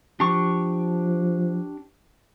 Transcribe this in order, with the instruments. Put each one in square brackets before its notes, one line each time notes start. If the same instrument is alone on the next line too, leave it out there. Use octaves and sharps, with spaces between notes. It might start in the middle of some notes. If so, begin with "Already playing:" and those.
[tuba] F3 [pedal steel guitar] D4 G4 C#6